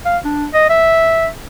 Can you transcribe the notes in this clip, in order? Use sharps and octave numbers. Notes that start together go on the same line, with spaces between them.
F5
D4
D#5
E5